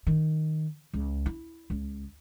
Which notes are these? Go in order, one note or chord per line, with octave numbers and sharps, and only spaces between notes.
D#3
C#2
E4
C#2